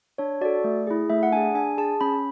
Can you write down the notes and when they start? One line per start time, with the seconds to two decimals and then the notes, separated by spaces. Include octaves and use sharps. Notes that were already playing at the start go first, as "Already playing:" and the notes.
0.18 D4 C#5
0.41 F#4 A4 D5
0.64 A3
0.87 E4 G#4
1.10 A3 E5
1.23 F#5
1.32 D4 G#4 G#5
1.55 D4 G#5
1.78 G#4 A5
2.01 C#4 B5